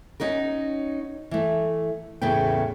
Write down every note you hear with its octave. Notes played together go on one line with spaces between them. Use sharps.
C#4 D#4 F#4 A#4
E3 A3
E2 A2 C#3 B4 G5